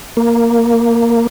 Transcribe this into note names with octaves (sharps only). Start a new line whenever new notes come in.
A#3